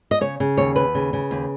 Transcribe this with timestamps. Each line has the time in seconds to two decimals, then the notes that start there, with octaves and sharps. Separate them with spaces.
0.11 D#5
0.21 C#3 C#5
0.40 C#3
0.57 D#2 C#5
0.76 D#2 B4
0.95 C#3
1.13 C#3
1.31 D#2